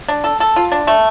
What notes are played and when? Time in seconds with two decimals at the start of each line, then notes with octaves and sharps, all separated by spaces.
0.08 D4
0.24 A4
0.40 A4
0.56 F4
0.72 D4
0.87 A3